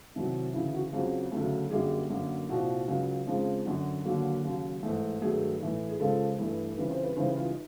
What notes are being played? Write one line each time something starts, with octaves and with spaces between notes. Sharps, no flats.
C2 C3 D#3 F#3
D2 C#3 E3 E4
F#4
F2 C#3 F#3 G#4
D2 C#3 F#3 A3
F#2 D3 G3 A#3 G#4
F#2 D3 F#3 A#3
C2 A#2 F3 F#4
C#2 C#3 F#3
F2 C#3 F3 G#3
F#2 D3 F#3 F#4
D#2 D3 F#3 A#3
D#2 C#3 F#3
G#2 E3 A3
G2 D#3 F#3 A3 G#4
A2 E3 A3
G#4
C#2 C#3 F3 G#3 A4
G2 E3 A3
F2 C#3 E3 G3 B4
C5
B4
C#2 C#3 E3 G3 C5
B4
F4
D#4